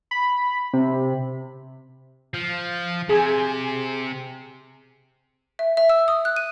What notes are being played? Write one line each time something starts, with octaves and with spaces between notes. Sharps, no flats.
B5
C3
F3
C3 G#4 G#5
E5
E5
E6
D#6
F#6
D#7